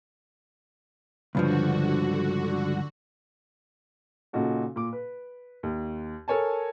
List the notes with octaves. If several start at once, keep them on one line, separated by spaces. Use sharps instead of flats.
C#2 G2 D3 F3 F#4
A#2 C#3 D#4 F#4 A4
A#2 D6
B4
D#2
A4 A#4 C#5 G#5 A5